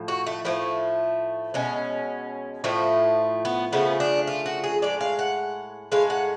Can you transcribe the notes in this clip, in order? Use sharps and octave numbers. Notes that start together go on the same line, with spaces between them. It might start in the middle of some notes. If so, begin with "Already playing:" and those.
Already playing: A2 F3
F#4
A3
A2 F3 A3 B3
B2 G#3 C#4
A2 F3 A3
B3
C#3 F3 A3 B3
D4
F4
F#4
G#4
A2 G#3 D5
F5
F#5
A2 G#3 F5
F#5